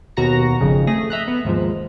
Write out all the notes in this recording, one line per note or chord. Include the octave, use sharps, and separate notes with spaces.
D#2 B2 F#4 A#5 A#6 C#7
G#1 F2 C#3
A3 G#4 A#6
D#5 E5 A#5 F#6
B3
D#2 G#2 F3